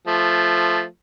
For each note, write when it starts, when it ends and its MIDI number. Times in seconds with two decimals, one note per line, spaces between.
0.07 0.84 53
0.07 0.84 57